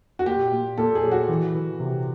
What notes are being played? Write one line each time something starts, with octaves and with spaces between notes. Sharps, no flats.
F#4
A#2 G4
A#2
A#2 A4
G#4
F#3
F#4
E3
E3
C3